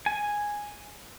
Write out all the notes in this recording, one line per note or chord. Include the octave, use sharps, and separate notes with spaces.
G#5